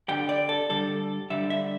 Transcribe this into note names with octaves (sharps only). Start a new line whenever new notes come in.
G2 D3 G3 G5
D5
A4
G2 D3 G3 A4
G2 D3 G3 E5
E5